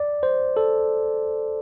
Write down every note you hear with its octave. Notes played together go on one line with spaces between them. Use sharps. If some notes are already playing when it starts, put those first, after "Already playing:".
Already playing: D5
C5
A4